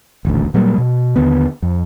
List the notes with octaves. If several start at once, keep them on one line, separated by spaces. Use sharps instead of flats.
D#1 A1 D2
A#2 F#3 G3 A#3
B2
D#2 D3 B3
F2